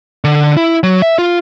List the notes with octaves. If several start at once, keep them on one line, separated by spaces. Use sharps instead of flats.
D3
E4
F#3
E5
F4